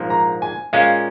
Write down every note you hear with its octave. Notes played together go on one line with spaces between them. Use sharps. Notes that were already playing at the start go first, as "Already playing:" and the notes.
Already playing: A#1 G#2 F3 A#3
A#5
G#5
A#2 G#3 C#4 F5